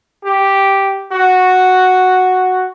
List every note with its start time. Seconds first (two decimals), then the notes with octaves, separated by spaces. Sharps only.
0.25 G4
1.12 F#4